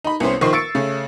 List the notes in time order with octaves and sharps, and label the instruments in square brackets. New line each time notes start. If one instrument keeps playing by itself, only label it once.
[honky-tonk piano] D#4 B5
C2 B3 C#4 C5
A#1 D#3 D#4 C5 C#6 C7
C#6 E6 A6 C#7 D7
C#3 A3 C#4